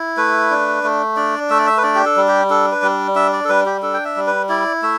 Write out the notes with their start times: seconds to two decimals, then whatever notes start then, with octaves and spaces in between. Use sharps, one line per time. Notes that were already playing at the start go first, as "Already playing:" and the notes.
Already playing: E4
0.17 A3 B4
0.51 D4
0.84 A3
1.16 D4 D5
1.50 A3 E5
1.58 D5
1.66 E5
1.77 B4
1.83 D4 D5
1.95 G4
2.05 A4
2.16 G3
2.28 G4
2.50 D4 A4
2.72 B4
2.82 G3
3.16 D4 E5
3.33 D5
3.45 A4
3.49 G3 B4
3.66 G4
3.82 D4 A4
3.94 G5
4.05 E5
4.16 G3
4.27 B4
4.49 E4 D5
4.82 A3 E5